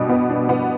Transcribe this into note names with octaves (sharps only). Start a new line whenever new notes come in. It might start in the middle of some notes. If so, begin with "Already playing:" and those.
Already playing: B2 G3 D4
B3
D4
B3